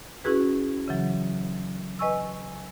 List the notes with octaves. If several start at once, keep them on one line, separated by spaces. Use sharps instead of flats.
C#4 E4 F#4 G#4 B4
C#3 E3 F#3
B4 D#5 G#5 C#6 E6